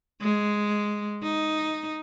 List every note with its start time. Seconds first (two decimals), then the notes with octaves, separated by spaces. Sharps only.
0.21 G#3
1.23 D#4